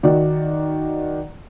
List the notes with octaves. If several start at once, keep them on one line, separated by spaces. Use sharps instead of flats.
D#3 F#4 D5